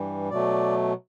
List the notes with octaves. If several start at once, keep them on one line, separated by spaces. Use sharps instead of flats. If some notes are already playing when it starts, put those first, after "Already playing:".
Already playing: G2 E3 G3
B2 F#3 A3 D5